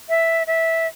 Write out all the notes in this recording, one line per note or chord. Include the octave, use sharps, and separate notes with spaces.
E5
E5